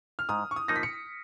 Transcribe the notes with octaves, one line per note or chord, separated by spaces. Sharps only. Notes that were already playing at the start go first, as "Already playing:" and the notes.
F6
G#2 D#6
C#6
D#6
F3 A#3 D#4 A#6
B6
C#7